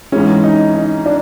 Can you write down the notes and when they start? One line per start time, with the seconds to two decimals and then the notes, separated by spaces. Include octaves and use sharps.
0.12 G#2 E3 G#3 C#4
0.44 D#4
0.75 D#4
1.06 D4